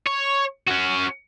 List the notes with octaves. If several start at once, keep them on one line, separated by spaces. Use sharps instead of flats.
C#5
C#4 F#4